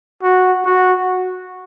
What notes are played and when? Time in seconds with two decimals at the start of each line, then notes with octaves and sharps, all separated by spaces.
0.23 F#4
0.65 F#4